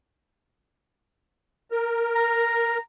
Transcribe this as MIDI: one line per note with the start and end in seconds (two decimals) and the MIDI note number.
1.71 2.78 70
2.16 2.79 82